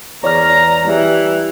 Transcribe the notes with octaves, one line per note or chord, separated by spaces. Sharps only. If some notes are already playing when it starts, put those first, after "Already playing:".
E2 C#5 D5 A#5 F6
E3 G3